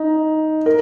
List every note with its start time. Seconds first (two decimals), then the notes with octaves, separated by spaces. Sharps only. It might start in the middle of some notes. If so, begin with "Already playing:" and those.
Already playing: D#4
0.66 A#4